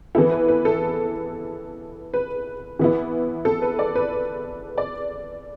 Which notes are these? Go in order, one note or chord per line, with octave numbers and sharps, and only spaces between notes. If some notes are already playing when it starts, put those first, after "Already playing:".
E3 B3 E4 A4
B4
B4
A4
B4
E3 B3 E4
A4
B4
D5
B4
D5